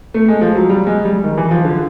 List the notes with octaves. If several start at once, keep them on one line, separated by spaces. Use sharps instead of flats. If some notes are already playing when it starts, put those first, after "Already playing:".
A3
G#3
F3
F#3
G3
G#3
G3
D#3
E3
F3
D3